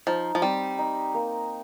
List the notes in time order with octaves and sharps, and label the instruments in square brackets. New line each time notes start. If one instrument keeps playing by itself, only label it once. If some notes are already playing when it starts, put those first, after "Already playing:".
[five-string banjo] F3 [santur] D#4
[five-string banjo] F3
[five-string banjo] G3 [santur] C4
[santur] D#4
A#3